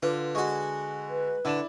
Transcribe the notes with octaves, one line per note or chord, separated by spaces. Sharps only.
D3 F4 B4 D6
G#3 F#4 C#6
B4
D3 E4 D5 E7